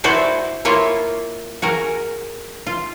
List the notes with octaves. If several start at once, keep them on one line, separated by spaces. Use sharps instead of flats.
E4 F#4 C5 D5
A#3 E4 F4 C#5
F#4 G#4 A#4
F4